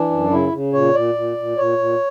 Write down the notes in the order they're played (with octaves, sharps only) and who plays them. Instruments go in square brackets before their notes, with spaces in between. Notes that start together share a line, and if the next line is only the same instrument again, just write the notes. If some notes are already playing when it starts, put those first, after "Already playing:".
Already playing: [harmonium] E3 D4
F#2
C#3 E4
C#3
A#2 C#5
A#2 D5
A#2
A#2
A#2 C#5
A#2